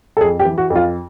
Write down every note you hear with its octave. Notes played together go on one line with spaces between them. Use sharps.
A4
F2 G#4
G4
E3
F#4
F2
F4